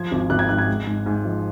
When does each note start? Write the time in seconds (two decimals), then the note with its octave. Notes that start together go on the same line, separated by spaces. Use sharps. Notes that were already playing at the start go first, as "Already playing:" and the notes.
Already playing: F3 G#6
0.11 G#1
0.30 G#1 F#6
0.39 G#6
0.49 G#2 F#6
0.58 G#6
0.67 G#3
0.86 G#2
1.06 G#2
1.25 F3